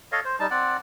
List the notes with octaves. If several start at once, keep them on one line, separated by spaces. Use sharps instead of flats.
A4 C#5 D#5 F5
C5
G3 D#4 A5
C4 D5 F#5